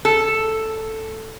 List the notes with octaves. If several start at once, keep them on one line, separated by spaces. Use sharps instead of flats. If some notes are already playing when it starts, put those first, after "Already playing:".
A4